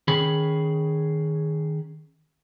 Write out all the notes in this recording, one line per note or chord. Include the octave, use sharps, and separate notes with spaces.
D#3 C#4 G#4 B5